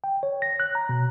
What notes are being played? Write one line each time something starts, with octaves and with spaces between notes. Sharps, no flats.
G5
C#5
A#6
F#6
A#5
B2